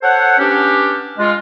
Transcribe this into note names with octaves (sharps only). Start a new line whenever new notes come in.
A4 C5 C#5 F#5
B3 C#4 D4 G4
G#3 F4